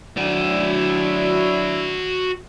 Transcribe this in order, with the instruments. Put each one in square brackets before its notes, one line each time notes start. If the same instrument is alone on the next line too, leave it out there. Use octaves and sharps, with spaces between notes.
[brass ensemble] F#3 D4 E4 [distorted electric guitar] F#4 D5